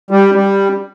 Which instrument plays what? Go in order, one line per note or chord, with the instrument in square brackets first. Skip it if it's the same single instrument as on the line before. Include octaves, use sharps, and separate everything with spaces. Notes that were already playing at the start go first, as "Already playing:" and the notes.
[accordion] G3
G3